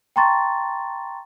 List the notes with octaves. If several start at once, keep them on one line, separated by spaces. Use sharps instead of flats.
G5 A5 A#5 C6 C#6 A6